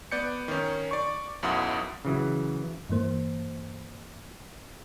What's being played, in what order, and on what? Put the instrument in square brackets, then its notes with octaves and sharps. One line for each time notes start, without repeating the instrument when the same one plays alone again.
[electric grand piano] B3 D5 G6 C#7
D#3 C#4
D5 C#6
B1 F#2 B2 E4 F#5 D#6
[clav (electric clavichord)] C#3 E3 F#3
[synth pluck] G2 E3 A#3 C5